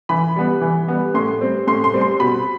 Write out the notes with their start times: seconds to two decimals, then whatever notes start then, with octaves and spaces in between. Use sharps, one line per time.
0.09 E3 B5
0.36 G3 B3
0.61 E3
0.88 G3 B3
1.14 A2 C6
1.41 G3 C4
1.67 A2 C6
1.84 C6
1.94 G3 C4
2.01 C6
2.20 B2 B5